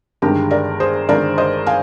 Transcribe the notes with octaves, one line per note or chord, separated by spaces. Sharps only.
G1 G2 D#3 G#3 G4 A#4
A#4 D5
G#4 C5
G1 G2 D#3 G#3 A#4 D5
C5 D#5
F5 G#5